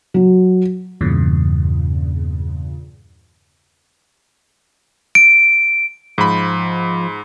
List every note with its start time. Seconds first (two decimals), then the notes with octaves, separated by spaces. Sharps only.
0.14 F#3
1.01 E2 G2 A#2 C#3
5.15 D7
6.18 G#2 F3 B5